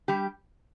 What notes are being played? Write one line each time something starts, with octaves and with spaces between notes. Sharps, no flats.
G3 G4